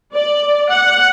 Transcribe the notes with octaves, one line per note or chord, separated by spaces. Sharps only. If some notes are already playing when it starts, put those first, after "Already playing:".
D5
F#5